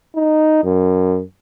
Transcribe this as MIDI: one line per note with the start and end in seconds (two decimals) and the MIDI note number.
0.16 0.64 63
0.64 1.21 42